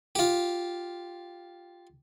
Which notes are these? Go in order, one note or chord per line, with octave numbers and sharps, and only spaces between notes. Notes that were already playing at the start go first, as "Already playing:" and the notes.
F4 G4